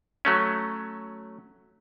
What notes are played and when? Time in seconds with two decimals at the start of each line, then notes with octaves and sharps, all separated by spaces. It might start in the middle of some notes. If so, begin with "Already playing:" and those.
0.25 F#3 A3 C#4